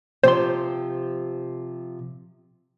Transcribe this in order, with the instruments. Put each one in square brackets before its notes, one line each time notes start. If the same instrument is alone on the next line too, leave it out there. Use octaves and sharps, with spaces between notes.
[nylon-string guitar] C3 F3 G4 [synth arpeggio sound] C5 C6